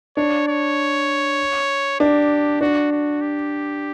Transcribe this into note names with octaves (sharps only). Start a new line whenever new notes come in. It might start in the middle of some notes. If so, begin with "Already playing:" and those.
D4 C#5
C#5
D4 G4
D4 F#4
F#4
G4